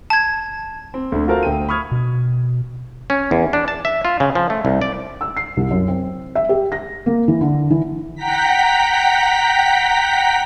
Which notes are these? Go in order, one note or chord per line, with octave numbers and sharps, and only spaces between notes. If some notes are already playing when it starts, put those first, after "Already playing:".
A5 G#6
C4
D2 D3
F4 F#4 A4 A#4 C5 F5
D2 G5 D#7
B5 C#6 D#6 F6 G#6
B2
C#4
E2
D4
A5
E5
F4
C#3
F3
A3
C2
D5
E6
C7
C2
F#2
C4
E5
G4
A#6
A#3
E3
D3
E3
F#5 G5 A#5 B6